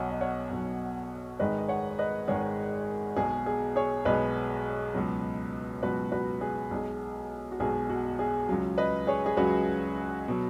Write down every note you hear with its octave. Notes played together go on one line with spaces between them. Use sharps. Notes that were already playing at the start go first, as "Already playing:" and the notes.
Already playing: B1 B2 F#3 C#5 D#5 F#5 G#5
D#5
C#5 F#5
B1 B2 F#3
G#1 G#2 D#3 G#3 B4 D#5
D#5
C#5 F#5
B4 D#5
G#1 G#2 D#3 G#3 G#4 C#5
B1 B2 G#3 G#4
G#4
G#4 C#5
B1 B2 G#3 B4 D#5
C#2 B2 F#3
C#2 B2 F#3 F#4 B4
F#4 B4
G#4
B1 B2 G#3
F#4
B1 B2 G#3 G#4
F#4
G#4
C#2 C#3 F#3
B4 D#5
G#4 C#5
G#4
C#2 C#3 F#3 F#4 B4
B2 F#3